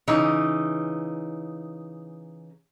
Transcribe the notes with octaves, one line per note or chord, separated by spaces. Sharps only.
C#3 E3 D#4